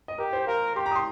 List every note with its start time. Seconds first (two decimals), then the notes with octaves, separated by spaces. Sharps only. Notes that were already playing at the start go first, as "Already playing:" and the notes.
0.08 D#5
0.18 G4 A#4
0.33 C5
0.47 A#4 F5
0.76 G4 C6
0.86 A#5
0.91 D#6
0.96 C6